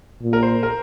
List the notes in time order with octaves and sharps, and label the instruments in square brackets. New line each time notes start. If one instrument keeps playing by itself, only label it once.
[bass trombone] A#2
[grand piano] A#4
C5
A#4